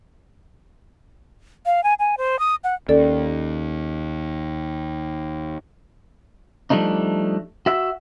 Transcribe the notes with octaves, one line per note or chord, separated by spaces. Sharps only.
F5
G#5
G#5
C5
D#6
F#5
D#2 C#4 A4 D5
F3 G3 A3 D4 D#4
F#4 E5